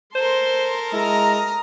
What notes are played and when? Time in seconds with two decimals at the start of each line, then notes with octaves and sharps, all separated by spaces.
0.15 A4 A#4 C5 C6
0.93 G#3 E4 A#5 D#6 F6